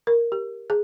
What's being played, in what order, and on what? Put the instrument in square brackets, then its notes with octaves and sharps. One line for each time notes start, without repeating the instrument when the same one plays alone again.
[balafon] A#4
G4
G#4